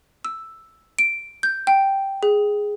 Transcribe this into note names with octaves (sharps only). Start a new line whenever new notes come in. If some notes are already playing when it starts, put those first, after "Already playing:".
E6
D7
G6
G5
G#4